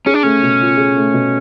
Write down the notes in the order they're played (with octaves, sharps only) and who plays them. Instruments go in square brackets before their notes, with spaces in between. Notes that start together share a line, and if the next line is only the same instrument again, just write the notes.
[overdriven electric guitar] C#4 [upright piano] G#4
[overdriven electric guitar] D4
[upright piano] A3 [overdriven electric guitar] C#4
[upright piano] B2
F4
G#4
A3
B2